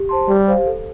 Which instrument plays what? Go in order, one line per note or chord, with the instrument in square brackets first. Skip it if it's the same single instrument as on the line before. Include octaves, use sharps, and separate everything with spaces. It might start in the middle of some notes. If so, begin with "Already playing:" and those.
Already playing: [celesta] G4
C5 A5 C6
[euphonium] G3 [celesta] G4
[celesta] C5 F5
A4